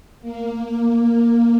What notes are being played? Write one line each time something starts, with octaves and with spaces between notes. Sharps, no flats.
A#3